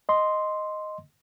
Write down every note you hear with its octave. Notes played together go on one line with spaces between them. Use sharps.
D#5 C6